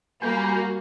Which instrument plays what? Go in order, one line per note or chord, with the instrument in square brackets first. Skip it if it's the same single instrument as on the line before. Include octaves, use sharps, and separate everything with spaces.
[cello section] G3 F#4 [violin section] A#3 [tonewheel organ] G#5 B5 G6